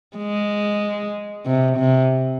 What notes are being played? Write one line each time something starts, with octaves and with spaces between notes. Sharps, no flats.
G#3
C3
C3